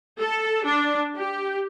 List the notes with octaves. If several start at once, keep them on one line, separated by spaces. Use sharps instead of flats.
A4
D4
G4